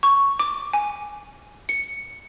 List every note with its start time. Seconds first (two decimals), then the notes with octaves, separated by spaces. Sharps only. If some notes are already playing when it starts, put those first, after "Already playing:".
0.03 C#6
0.39 D6
0.73 G#5
1.69 C#7